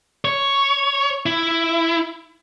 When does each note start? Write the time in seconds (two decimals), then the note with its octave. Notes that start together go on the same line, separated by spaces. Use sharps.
0.25 C#5
1.26 E4